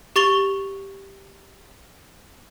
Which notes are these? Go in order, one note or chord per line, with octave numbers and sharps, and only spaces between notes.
G4 C#6 A6 F7 G7